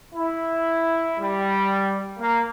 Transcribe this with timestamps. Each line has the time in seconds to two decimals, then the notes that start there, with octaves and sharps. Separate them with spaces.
0.15 E4
1.20 G3
2.19 A#3